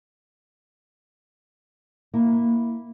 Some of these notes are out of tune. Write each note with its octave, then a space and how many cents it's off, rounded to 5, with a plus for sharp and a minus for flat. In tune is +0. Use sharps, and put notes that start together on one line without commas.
A#3 +0 E4 -5